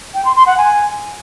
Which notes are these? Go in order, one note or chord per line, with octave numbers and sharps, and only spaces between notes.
G5
C6
C6
F#5
G#5